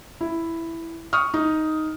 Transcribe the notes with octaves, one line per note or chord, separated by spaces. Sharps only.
E4
C#6 D#6 F6
D#4